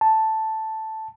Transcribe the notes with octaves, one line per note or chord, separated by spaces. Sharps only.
A5